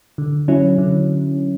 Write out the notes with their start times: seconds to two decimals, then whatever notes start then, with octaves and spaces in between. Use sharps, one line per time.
0.18 D3
0.48 F#3 C#4 E4
0.78 D3